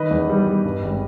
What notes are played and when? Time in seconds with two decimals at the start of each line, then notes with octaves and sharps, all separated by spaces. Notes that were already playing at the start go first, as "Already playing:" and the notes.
Already playing: D#3 B4 D#5
0.11 E2
0.29 G3
0.46 G3
0.65 G2
0.82 G#1